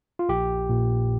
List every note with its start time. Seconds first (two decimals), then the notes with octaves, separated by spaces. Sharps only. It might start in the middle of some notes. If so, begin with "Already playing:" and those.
0.19 F4
0.29 A#1 G4
0.69 A#2